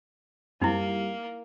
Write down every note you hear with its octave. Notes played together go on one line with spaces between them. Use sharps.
F#2 G3 A#3 C4 D#4 E4